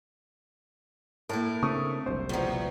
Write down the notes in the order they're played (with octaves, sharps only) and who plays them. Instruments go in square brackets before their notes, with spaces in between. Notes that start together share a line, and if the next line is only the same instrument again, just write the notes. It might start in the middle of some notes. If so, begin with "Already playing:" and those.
[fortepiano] A2 [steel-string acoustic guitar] A#3 E4 A#4
[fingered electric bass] C#3 C4 D4 [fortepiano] A3 C#6 D#6
[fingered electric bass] F#1 C2 C3 [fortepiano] C5
[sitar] E2 [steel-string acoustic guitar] B2 F3